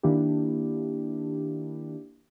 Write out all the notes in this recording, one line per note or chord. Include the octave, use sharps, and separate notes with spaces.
D#3 A#3 D4 E4 G4